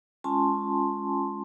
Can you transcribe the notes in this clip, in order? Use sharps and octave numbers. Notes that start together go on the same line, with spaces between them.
G#3 C#4 F4 G#5 A5 C6